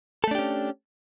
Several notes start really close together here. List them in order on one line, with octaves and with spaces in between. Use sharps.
A4 A3 D4 G4 C#4